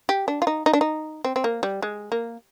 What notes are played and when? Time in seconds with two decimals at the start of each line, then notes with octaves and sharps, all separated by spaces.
0.09 G4
0.28 D4
0.42 F4
0.47 D#4
0.66 D#4
0.73 D4
0.81 D#4
1.25 C4
1.36 C4
1.44 A#3
1.63 G3
1.82 G#3
2.12 A#3